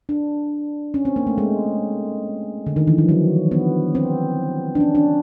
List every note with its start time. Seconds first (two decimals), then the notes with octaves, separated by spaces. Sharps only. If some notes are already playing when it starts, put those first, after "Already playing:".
0.09 D4
0.94 C#4
1.05 C4
1.16 A#3
1.27 A3
1.38 G#3
2.66 D3
2.76 D#3
2.87 E3
2.98 F3
3.09 F#3
3.51 B3
3.95 C4
4.75 D4
4.80 C#4
4.95 D4